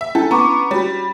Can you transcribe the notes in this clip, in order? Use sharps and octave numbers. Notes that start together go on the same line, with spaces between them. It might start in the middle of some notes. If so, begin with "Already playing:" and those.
E5
C#4 D4 E4 A4
B3 A#5 C#6 D6
G3 F#4 C#5